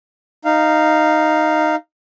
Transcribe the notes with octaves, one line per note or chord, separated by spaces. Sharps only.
D#4 F5